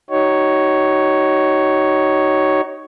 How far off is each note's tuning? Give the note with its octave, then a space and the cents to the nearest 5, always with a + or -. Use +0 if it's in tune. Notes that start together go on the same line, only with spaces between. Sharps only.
D#4 +0 F#4 +40 C#5 +0